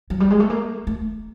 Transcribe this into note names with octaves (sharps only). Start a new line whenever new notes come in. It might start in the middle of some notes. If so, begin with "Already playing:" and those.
F#3
G3
G#3
A3
A#3
A3